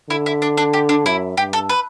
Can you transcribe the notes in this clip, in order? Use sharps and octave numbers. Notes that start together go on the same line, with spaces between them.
D3 E4
E4
D4
D4
G4
D4
F#2 E4
G2 G4
A4
B4